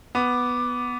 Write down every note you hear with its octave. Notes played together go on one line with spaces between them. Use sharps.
B3 D6